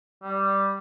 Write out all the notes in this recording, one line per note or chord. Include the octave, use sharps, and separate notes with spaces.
G3